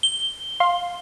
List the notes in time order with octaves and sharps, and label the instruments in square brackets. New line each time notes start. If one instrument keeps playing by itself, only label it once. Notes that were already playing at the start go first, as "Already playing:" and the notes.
[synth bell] G7
[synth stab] F5 C6